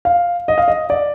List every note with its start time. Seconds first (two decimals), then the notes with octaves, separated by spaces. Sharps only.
0.05 F5
0.48 D#5
0.58 F5
0.68 D#5
0.90 D5